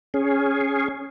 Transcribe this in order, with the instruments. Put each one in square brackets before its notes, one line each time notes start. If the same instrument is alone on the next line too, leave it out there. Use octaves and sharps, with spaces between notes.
[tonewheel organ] C#4 G#4